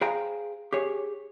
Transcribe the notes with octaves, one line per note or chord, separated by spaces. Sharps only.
G#4 C5 F5 G5 A#5
G4 G#4 C#5